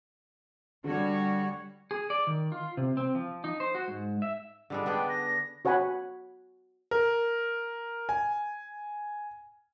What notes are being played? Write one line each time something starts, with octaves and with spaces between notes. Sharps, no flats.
D3 G3 F#4 C#5
G#4
D5
D#3
F4
C3
C4
F3
D#4
C5
F#4
G#2
E5
D3 G3 G#3
B3 D4 G#4 G5
A#6
F#4 C#5 F#5 G#5 B5
A#4
G#5